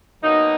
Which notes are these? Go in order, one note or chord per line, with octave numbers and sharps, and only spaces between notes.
B2 F#3 A#3 D#4